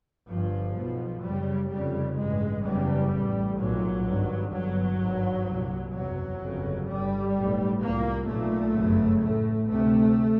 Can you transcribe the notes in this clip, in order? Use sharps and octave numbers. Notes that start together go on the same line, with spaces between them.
G1 G2 F3
B1 B2
F#1 F#2 C#3 G3
F1 F2 C#3 G3
A1 G2 G#3
F#1 E2 C#3 G3
A1 A2
B1 A#2 F#3
G#1 G2
G1 G2 F#3
G#1 G2
C2 A#2
F#1 E2 C3 F#3
G1 F2 C#3
G1 G2 G3
B1 A2
C2 A#2 A#3
B1 A#2 A3
G1 F#2 C#3
A1 A2 A3
D2 C3 A3